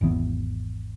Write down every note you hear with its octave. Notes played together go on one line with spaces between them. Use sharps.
G#1 E2 E3 B3